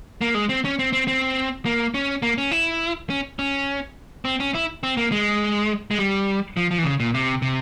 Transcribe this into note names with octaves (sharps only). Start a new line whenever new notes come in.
A#3
G#3
C4
C#4
C4
C4
C4
A#3
C#4
A#3
C#4
E4
C#4
C#4
C4
C#4
E4
C4
A#3
G#3
G#3
G3
F3
F3
E3
C#3
A#2
C3
C3